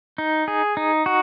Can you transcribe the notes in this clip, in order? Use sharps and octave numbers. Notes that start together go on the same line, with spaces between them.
D#4
G#4
D#4
F#4